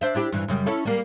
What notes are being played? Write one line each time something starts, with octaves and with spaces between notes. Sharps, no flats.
D4 C5 E5
D4 E4 G4
G2 E3
F#2 C#3 G3
C#4 E4 A4
G3 A#3